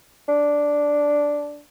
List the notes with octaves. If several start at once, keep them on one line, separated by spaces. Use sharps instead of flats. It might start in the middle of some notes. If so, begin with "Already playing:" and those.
D4